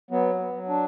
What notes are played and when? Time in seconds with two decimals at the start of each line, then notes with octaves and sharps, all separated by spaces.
0.10 F#3 B3
0.39 B3
0.53 F#3
0.68 D4